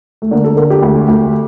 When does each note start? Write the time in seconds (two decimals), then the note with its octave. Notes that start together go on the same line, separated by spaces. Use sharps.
0.22 A3
0.31 D3 A#3
0.45 A4
0.57 D3 A#4
0.70 G4
0.82 D2
1.08 D2